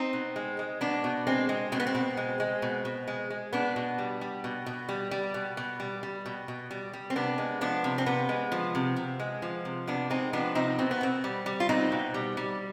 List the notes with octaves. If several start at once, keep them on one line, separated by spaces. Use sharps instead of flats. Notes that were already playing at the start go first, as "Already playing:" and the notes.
Already playing: C4 D#4
B2
G#3
G#3
B2 B3 D4
B2
G#3 C4
G#3
B2 C4
B3
C4
B2
G#3
G#3
B2
B2
G#3
G#3
B2 B3 D4
B2
G3
G3
B2
B2
G3
G3
B2
B2
G3
G3
B2
B2
G3
G3
C4
C3 B3 D4
G#3
F3 B3 D4
C3
C4
C3 B3
G#3
F3
C3
C3
G#3
F3
C3
C3 B3 D4
G#3 C4 D#4
F3 B3 D4
C3 C4 D#4
B2 C4
B3
B2 C4
G3
G3
F4
B2 C4 D#4
B2
G3
G3